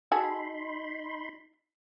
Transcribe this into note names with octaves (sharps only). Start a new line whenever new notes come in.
D#4 F#4 G#4 A4 B5 C6